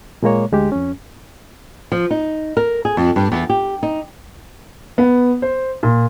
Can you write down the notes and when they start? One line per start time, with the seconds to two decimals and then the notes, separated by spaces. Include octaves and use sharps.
0.23 A#2 G#3 A#3 C#5
0.52 D2 G#3 G4
0.72 F2 C#4
1.92 F3
2.11 D#4
2.57 A#4
2.85 G#4
2.97 F2
3.16 G2
3.32 E2
3.50 G4
3.83 D#4
4.98 B3
5.42 C5
5.83 A#2